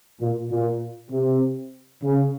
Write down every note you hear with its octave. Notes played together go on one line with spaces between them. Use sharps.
A#2
A#2
C3
C#3